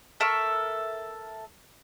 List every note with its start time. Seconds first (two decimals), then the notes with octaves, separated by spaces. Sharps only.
0.20 A4 A#4 E5 C#6